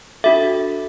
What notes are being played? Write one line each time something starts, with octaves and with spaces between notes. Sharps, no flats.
D4 F#4 A4 E5